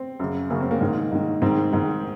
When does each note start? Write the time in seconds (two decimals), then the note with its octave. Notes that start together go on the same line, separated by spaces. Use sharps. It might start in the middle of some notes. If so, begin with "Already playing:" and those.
Already playing: C4
0.20 F#2 C#3
0.50 F#2 C#3 A#3 C#4
0.61 C4
0.71 A#3
0.81 G#2 D#3
1.12 G#2 D#3
1.42 G#2 D#3 C4
1.73 G#2 D#3